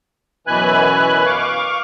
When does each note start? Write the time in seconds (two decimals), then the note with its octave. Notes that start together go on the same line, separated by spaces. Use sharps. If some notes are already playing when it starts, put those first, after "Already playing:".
0.47 F#2 B2 E3 B4 G#5 F#6
1.26 F5 C#6 D6